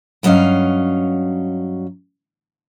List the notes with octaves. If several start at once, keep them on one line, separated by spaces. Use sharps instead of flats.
G2 F#3 C#4 D#5 F5